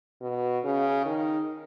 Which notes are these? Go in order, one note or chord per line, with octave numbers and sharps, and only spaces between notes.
B2
C#3
D#3